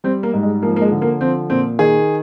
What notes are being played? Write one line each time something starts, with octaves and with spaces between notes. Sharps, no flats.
G3 C4
A#3
G#2
G#3
F3 A#3
A#3
G#3
D3
A#3
F3 C4
A#2 C4
D#3 G#4